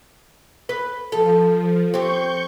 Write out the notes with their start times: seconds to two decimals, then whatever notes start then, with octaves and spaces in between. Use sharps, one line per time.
0.69 B4
1.12 F3 A4
1.94 C4 G4 C#6 G6